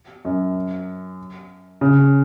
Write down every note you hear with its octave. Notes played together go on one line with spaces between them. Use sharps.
F#2
C#3